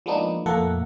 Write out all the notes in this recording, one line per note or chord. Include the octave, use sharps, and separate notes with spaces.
F3 G#3 A#3 B3 D4 D#4
F2 A#2 A3 A#3 A4 F#5